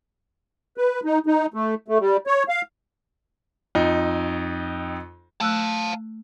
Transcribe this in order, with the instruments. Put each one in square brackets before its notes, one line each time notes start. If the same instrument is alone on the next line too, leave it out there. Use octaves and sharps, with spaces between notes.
[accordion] B4
D#4
D#4
A3
A3
G3
C#5
F5
[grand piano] F2 D#4
[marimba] A3 E6 F#6 [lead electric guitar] F5 A5